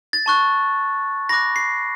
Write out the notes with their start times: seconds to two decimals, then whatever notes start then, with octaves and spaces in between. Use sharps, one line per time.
0.13 A6
0.26 A5 C#6 F#6
1.29 B5 D6 F#6 A#6
1.56 C7